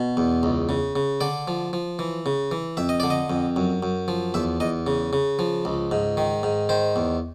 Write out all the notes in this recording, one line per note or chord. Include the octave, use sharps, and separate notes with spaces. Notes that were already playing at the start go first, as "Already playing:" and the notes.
Already playing: B2
E2
C#2
C#3
C#3
D3 D5
F3
F3
E3
C#3
E3
F2 E5
D#5
D3 D5
D#5
F2
F#2
F#2
F3
E2 E5
E2 D#5
C#3
C#3
F3
C#2
G#2
D#3
G#2
D#3 C5
E2